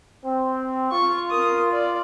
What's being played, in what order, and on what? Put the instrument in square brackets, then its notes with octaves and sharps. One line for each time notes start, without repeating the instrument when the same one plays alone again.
[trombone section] C4
[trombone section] F4 [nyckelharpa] C#6
[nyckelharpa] A#4 D#6
D5